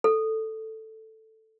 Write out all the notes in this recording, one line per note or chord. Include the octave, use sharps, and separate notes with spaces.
A4